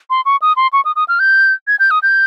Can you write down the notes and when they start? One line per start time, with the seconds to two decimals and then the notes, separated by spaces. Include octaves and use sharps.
0.10 C6
0.25 C#6
0.42 D#6
0.56 C6
0.73 C#6
0.85 D#6
0.96 D#6
1.08 F6
1.19 G6
1.67 G#6
1.79 G6
1.91 D#6
2.03 G6